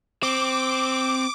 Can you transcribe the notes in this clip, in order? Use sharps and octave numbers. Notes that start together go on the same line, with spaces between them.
C4 D6